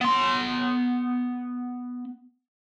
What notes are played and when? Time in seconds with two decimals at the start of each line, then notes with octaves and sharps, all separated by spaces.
0.01 B3 C6